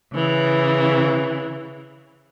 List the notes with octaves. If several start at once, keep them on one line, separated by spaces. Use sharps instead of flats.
C#3 E3